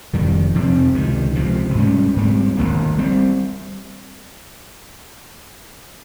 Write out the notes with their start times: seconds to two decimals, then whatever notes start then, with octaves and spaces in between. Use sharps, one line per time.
0.13 F1 F2 D#3 G3
0.54 F2 C3 F3 C4
0.94 C#2 C3 D#3
1.36 C#2 C3 F3
1.75 G#2 G3 C#4
2.16 G#2 G3 C4
2.57 G1 F2 D#3 A#3
2.98 G3 C4